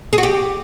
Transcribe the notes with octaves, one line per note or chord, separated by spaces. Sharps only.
G#4
F#4
G4